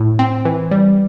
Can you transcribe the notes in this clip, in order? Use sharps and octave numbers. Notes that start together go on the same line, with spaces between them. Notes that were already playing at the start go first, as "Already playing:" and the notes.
Already playing: A2
C4
E3
G3